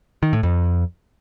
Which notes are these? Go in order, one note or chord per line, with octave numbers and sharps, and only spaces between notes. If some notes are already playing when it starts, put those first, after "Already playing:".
D#3
A2
F2